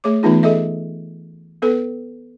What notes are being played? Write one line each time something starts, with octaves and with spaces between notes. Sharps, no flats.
A3 G#4 C#5 D6
E3 A3 B3 D#4 F4 G#4
G#4 A4 D#5 E5
B3 A4 B4